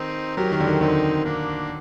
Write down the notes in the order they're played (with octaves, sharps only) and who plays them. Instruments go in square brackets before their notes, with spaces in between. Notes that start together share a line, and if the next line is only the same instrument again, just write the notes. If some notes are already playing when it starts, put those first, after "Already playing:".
Already playing: [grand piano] D#3 [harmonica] C4 D#4
[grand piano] F#3 [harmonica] G4 A#4
[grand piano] D#3
D3
D#3
[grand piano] D3 [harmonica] C4 D#4
[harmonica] A#3 D4